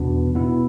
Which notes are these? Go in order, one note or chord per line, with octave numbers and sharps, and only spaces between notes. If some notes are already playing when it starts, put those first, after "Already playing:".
Already playing: E2 B2 B3 D4
B2 B3 E4